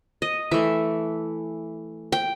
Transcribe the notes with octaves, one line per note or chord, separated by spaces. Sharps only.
D#5
E3 A3 E5
G5